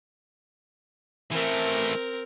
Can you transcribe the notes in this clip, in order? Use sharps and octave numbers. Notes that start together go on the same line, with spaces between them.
E3 A3 C4 A#4